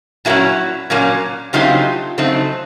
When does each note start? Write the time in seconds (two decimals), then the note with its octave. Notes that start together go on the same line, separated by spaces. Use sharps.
0.25 A#2 F#3 A#3 C#4 E4 F#4
0.90 A#2 F#3 A#3 C#4
1.53 C#3 F#3 A3 C4 D#4 F4 G4
2.18 C#3 F#3 A3 C4 D#4